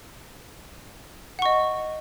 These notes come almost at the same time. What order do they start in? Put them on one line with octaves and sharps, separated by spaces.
F#5 C#6 D#5